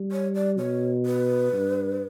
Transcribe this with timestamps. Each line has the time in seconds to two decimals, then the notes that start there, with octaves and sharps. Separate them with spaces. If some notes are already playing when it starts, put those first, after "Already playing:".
Already playing: G3
0.12 C#5
0.35 D5
0.58 B2 C#5
1.06 B4
1.52 G2